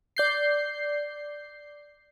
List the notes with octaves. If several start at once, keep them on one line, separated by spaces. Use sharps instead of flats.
D5 G6 C7